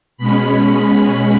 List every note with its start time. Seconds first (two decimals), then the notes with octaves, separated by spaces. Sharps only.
0.18 B2 G#3 C#4 B5
0.54 B5